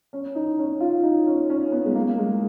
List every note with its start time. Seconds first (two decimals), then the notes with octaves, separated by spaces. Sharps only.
0.13 C#4
0.35 D#4
0.59 C#4
0.80 F4
1.03 D#4
1.27 C#4
1.50 C#4
1.72 B3
1.85 G#3
1.95 A#3
2.18 G#3